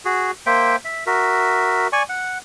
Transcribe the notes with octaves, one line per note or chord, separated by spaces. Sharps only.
F#4 G#4
A#3 C5 E5 G5
E5
F#4 A#4 E5
D5 G#5 C#6
F#5